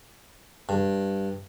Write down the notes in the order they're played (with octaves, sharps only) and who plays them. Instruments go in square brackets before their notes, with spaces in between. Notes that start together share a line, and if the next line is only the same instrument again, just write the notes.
[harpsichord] G2